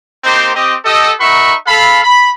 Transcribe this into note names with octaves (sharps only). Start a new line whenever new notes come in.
A#3 C4 D#4 G4 C5
C4 G4 D#5
G4 A4 D#5
D#4 F#4 A#4 E5 B5 C#6
A4 F5 B5
B5